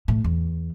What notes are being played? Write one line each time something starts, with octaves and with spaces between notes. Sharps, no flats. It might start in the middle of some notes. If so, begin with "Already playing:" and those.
A2
E2